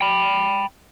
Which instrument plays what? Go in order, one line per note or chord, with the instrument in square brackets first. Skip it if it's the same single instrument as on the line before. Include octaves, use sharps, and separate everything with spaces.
[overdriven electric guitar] G5 B5